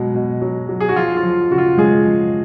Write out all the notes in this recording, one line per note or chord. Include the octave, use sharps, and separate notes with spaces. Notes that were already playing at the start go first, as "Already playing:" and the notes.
Already playing: B2 F#3 G#3
B2
F#3
F#3
G#4
F#4
F3 F4
F4
F3
C#3 F#4
F4
C#3 G#3 G#4
F3